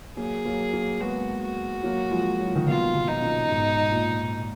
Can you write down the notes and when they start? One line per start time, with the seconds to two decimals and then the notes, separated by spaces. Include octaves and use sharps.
0.17 F#3 A#3 G#4
0.45 F#3 A#3
0.73 F#3 A#3
1.00 G#3 B3 F#4
1.42 F#4
1.83 F#3 A#3
2.11 F3 G#3
2.39 F#3
2.47 F3
2.56 D#3 F#3
2.67 B2 D#3 F4
2.95 B2 D#3
3.08 D#4
3.22 A#2 C#3
3.50 G#2 B2
3.92 A#2